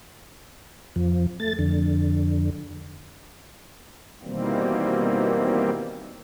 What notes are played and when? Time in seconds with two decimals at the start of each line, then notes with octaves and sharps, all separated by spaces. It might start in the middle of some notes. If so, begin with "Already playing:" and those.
0.96 F2 F3
1.40 A3 A6
1.59 F2 D3
4.23 B2 D#3 E3 G3 A#3 C4